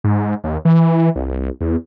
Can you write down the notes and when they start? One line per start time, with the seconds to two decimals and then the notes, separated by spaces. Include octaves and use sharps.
0.04 G#2
0.44 D#2
0.65 E3
1.16 C2
1.61 E2